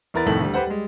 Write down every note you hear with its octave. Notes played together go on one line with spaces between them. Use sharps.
E2 E4 A#4 B4 A6
C2 F2 A2 D#3 A3 F#7
D2 G3
G4 B4 C5 F#5
G3 G#3